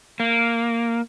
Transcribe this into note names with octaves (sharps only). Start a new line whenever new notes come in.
A#3